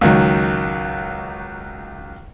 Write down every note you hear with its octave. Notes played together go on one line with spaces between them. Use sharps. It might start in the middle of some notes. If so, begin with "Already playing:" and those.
C#2 D#3 F#3